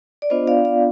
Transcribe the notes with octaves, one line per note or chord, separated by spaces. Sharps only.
D5
B3 D4 F4 C5 D#5
D5 F5
D5 F5